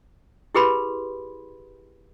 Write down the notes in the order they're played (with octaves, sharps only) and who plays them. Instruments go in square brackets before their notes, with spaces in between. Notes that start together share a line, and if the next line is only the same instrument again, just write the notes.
[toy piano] E4 G4 G#4 B4 B5 C6